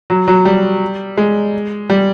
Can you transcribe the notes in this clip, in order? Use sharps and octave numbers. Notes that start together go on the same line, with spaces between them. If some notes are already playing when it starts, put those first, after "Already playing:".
F#3
F#3
G3
G#3
G3